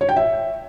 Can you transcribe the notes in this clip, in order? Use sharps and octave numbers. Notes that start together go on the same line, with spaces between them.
C#5
G5
E5